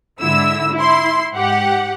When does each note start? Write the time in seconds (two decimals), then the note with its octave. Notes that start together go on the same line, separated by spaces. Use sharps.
0.20 G#2 D3 E4 E6
0.74 E4 C6
1.33 G#2 G4 F#5